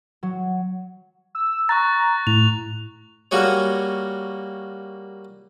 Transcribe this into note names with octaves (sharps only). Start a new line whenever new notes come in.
F#3
E6
A#5 C#6 F#6 A6
A2 F7
G3 A#3 F#4 G#4 C#5